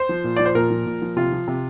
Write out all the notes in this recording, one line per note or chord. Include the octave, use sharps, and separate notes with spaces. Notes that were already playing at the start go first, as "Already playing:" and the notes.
Already playing: C5
F3
A#2
F3 D5
C5
A#2 A#4
F3
A#2
F3
C3 F4
F3
C3